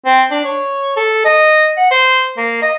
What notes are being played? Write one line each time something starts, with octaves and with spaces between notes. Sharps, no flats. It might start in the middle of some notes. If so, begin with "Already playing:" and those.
C4
D4
C#5
A4
D#5
F#5
C5
A#3
D#5